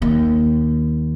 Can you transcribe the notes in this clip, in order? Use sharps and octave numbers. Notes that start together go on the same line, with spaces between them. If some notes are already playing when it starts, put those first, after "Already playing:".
D#2